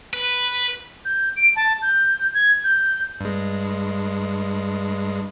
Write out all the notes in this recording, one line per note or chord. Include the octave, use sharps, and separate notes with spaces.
B4
G6
D7
A5
G6
G#6
G6
G2 G#3